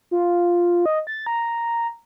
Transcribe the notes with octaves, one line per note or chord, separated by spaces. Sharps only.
F4
D#5
A6
A#5